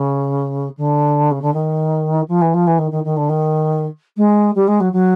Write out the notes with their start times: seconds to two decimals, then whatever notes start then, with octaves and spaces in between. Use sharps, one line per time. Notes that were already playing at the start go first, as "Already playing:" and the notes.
Already playing: C#3
0.77 D3
1.31 C#3
1.41 D3
1.53 D#3
2.28 F3
2.41 E3
2.53 F3
2.66 E3
2.78 D#3
2.91 D#3
3.04 D#3
3.16 D3
3.29 D#3
4.16 G#3
4.55 G3
4.67 G#3
4.80 F#3
4.92 F#3